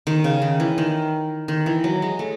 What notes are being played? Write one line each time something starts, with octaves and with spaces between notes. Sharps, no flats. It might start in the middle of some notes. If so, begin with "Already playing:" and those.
D#3
C#3
D#3
E3
D#3
D#3
E3
F#3
G#3
A3